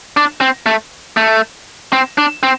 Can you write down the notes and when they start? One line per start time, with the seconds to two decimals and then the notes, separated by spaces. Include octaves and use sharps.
0.17 D4
0.41 C4
0.66 A3
1.17 A3
1.93 C4
2.18 D4
2.43 C4